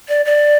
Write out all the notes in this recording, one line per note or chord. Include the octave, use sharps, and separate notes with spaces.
D5
D5